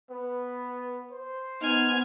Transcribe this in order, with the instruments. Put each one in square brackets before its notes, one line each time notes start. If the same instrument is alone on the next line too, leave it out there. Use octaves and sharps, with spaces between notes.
[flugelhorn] B3 [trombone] B4
[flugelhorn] C5
[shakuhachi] B3 [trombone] D#4 [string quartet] G#5 F6 G#6